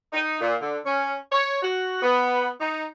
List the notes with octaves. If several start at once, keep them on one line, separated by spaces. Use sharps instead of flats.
D#4
A#2
D3
C#4
C#5
F#4
B3
D#4